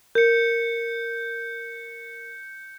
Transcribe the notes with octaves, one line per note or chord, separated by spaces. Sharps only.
A#4 G6 C#7